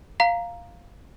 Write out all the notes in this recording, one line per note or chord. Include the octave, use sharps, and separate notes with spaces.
F5 A#5 B6